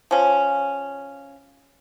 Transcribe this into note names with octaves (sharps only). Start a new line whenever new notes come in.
F3 C#4